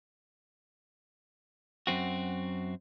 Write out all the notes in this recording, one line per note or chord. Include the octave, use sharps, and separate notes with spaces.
F#2 C4 F#4